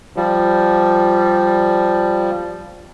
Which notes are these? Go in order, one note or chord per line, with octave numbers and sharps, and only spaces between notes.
F3 G3